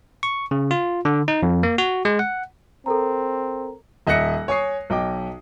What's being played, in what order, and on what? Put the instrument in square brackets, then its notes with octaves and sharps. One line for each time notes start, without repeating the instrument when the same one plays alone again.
[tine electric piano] C#6
C#3
F4
D3
D#4
F2
A#3
F#4
G#3
F#5
[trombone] C4 [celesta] A4 A#4 A#5
[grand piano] D#1 D#5 E5 F#6 A#6 C#7
C#5 G#5 C#6 D#6 C7
B1 D#5 G5 D6